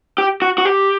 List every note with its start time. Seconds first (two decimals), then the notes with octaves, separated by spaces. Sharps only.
0.18 G4
0.42 F#4
0.58 F#4
0.65 G4